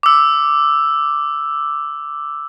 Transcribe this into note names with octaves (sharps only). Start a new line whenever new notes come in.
D6 E6